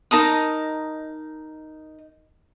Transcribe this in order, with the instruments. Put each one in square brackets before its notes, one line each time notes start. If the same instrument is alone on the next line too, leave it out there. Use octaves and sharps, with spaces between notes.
[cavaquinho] D#4 A#4 A5 D#6